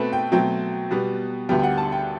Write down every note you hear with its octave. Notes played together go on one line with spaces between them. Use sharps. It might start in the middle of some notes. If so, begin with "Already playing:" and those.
Already playing: B2 A3 C4 A4 B4
G5
B2 F#3 A3 C4 G5
B2 G3 B3
D2 D3 G3 B3 G5
G5
F#5
A5
G5